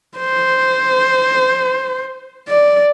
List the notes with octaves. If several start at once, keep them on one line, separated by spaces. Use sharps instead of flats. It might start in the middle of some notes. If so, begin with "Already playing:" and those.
C5
D5